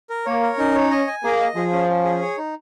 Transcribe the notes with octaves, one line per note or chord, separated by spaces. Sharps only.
A#4
A#3 C#5
A#4
C#4 D#4
C#5
D#5
G#5
A#3 G#4
D#5
F3 G#4
C#4
C#4
G#4
C#5
D#4